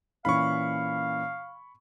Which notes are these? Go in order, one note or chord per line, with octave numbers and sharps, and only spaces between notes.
A#2 E3 C#4 F5 B5 C#6